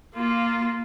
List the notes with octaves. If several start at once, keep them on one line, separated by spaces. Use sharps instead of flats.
A#3 F4